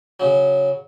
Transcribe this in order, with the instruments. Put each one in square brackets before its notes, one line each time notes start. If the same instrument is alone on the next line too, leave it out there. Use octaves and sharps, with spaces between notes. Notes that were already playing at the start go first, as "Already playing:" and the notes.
[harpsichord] C#3 F#3